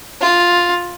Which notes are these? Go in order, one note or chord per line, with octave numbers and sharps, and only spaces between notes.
F4